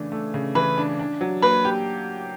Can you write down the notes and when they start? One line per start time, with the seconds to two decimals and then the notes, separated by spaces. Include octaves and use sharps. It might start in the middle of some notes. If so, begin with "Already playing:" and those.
Already playing: C#3 E3 A3 D4
0.12 A3
0.34 C#3
0.55 E3 B4
0.78 D4
0.99 D4
1.21 F#3
1.42 A#3 B4
1.65 G4